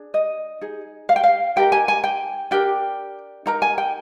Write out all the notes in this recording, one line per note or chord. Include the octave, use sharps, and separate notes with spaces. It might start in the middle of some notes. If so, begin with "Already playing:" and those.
Already playing: D4 G#4
D#5
D#4 G#4
F5
G5
F5
D#4 G4 A#4 G5
G#5
G#5
G5
D4 G4 A#4 G5
D#4 A#4 A#5
G#5
G5